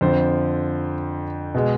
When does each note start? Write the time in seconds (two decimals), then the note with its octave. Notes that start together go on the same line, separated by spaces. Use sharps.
0.01 F2 D3 F3 C5
1.54 B2 G#3